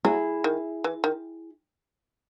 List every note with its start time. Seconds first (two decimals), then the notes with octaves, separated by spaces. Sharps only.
0.04 F#3 E4 G#4
0.44 D#3
0.84 E3
1.04 D#3